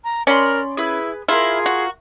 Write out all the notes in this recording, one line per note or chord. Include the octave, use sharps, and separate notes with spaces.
A#5
C#4 A#4 D5 B5 C6
E4 G#4 B4
E4 F4 G#4 A#4
F#4